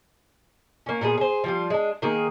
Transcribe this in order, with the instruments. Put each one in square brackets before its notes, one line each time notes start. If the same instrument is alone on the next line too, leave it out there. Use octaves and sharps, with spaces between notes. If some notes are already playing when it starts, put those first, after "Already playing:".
[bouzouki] A#3 C#4
A#2 B3 F4 G#4
G#4 C5
F3 G3 F4
G#3 D4
D#3 A#3 G#4